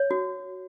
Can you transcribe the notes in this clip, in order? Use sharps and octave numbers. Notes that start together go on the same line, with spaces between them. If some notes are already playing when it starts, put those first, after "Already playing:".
Already playing: C#5
F#4